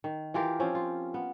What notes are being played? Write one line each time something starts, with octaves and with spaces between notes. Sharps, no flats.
D#3
E3 F4 G4 A#4
F3 C4 C#4
F4
B3